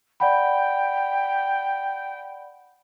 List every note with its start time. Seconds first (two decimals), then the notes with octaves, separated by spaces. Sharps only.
0.20 D5 F#5 G5 B5